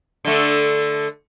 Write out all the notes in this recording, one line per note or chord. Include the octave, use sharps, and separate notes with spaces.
D3 A3